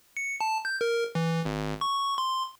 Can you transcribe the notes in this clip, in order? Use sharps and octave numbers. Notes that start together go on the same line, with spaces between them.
C#7
A5
G6
A#4
E3
G#1
C#6
C6